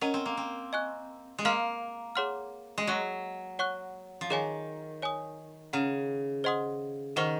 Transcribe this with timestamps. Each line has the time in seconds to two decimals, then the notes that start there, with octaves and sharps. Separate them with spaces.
0.01 C#4 A#4 D#5 F#5 A#5
0.14 C4
0.26 A#3
0.37 C4
0.73 D#5 G#5 C#6 F#6
1.38 G#3
1.45 A#3 F5 C6 F6
2.15 G#4 C#5 F#5 C6 F6
2.78 G#3
2.87 F#3 D#5 A#5 C#6 F#6
3.59 C#5 F#5 C#6 F#6
4.21 F3
4.30 D#3 G#4 C#5 G#5
5.02 C#5 G#5 D#6
5.73 C#3 F#5 A#5 F6
6.44 C5 D#5 F#5 C6 D#6
7.16 D#3 G#4 C5 F#5 C#6 F6